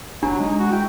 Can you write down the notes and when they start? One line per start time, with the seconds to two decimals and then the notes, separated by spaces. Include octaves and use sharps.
0.23 F#1 F#3 D4
0.40 G#3 D#4
0.59 F#4
0.72 E4 G5